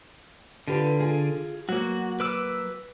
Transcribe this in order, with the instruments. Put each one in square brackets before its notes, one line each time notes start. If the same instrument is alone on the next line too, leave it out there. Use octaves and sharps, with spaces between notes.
[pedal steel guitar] D3 [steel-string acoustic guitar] F4 G4 B4
[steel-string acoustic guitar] F4 G#4
[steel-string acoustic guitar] F#3 A#3 [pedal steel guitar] F#4
[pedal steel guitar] B4 D6 E6